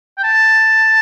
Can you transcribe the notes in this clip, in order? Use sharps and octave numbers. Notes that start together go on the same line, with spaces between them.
G5
A5